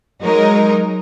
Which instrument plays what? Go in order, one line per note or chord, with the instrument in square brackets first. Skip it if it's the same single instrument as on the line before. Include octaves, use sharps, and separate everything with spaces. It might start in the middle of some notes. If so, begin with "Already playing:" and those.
[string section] F#3 G#3 D#4 A#4